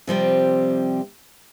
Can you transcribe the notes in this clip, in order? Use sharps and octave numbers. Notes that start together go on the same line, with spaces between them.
C3 F3 G3 C4